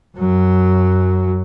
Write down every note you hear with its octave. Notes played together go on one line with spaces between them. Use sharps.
F#2 F#3